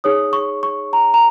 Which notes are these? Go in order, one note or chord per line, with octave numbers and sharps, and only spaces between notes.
D#4 G#4 C#5 D#6
C#6
C#6
A#5
A#5